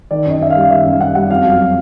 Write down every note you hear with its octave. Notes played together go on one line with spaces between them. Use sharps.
D#3 D5
F#2 D#5
F#2 E5
F5
G3
F5
D#3 E5
F#2 F5
F#2 F#5
G3 F#5
F2 F5
F#3 F5